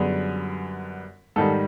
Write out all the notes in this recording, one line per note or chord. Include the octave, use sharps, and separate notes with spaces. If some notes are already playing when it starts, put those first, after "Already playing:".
Already playing: F#2 D3 G3 B3 G#4
G#2 D#3 G3 A4